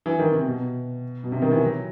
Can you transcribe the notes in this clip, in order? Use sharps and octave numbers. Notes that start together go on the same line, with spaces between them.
E3
D#3
C3
B2
B2
C3
D#3
E3
F#3